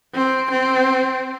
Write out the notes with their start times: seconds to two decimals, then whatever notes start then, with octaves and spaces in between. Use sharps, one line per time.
0.14 C4
0.51 C4